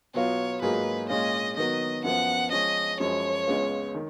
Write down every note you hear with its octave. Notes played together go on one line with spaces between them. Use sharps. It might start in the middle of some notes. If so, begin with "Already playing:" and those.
B2 F#3 B3 F4 C#5
G#2 F#3 A#3 F4 G#4 B4
A#2 G#3 C#4 F4 D#5
D#3 F#3 B3 D#5
F#2 F3 B3 F#5
F3 G#3 C#4 D#5
F#2 F3 G#3 C#5
C#2 C#3 G#3 B3 F4
D#3